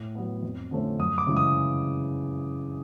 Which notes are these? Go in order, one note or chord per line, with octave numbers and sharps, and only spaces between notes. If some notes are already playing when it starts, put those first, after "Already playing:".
Already playing: A2
F#3 B3
F2
D3 F3 A3 C#4
F#2 D#6
D6
C#3 E3 G#3
D#6